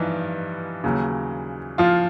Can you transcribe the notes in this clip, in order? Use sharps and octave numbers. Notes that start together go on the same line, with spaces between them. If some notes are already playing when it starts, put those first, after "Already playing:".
Already playing: G2 E3 F3 D#4
D#2 C#3 F#3
F3 F4